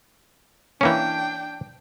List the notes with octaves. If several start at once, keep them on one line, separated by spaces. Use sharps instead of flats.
E3 A#3 C#4 D4 G5